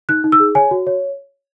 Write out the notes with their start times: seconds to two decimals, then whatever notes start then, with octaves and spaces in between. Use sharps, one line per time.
0.09 D#4 F#6
0.24 D#4
0.32 E6
0.40 G#4
0.55 C#5 G#5
0.71 F#4
0.87 C#5